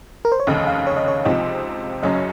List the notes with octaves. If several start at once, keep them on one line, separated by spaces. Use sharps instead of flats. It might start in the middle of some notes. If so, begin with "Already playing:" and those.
A#4
C5
C#5
F1 D#2 C#3 D#5
F5
C#5
D#5
C#5
C#2 C3 F3 C4 D#4 D#5
F#1 F#2 C#3 F#3 C#4 D#5